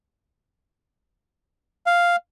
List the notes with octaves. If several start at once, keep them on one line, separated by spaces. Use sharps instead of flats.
F5